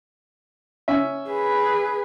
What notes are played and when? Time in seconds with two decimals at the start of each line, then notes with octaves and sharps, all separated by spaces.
0.88 C#4 E5
1.29 G#4 B4